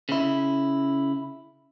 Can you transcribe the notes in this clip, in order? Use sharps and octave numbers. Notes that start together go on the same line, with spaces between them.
C#3 E4